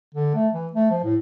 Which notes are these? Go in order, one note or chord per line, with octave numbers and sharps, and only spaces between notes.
D3
A3
E3
A3
F3
A2